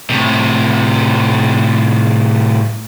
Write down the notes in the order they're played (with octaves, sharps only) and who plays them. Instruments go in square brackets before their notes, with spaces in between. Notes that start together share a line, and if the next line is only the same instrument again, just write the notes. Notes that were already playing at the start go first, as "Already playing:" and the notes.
[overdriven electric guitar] A2 C3